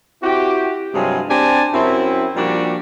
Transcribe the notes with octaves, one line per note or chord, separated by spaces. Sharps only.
C4 E4 F#4 G4
G2 C3 F#3 G#3 F4 G#5
C4 D4 G4 G#5 A5
F#2 C4 E4
A#2 F3 G3 D4 F#4 G4